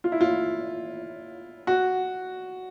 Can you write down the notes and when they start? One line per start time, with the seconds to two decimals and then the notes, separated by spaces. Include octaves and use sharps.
0.04 F4
0.12 E4
0.21 F4
1.67 F#4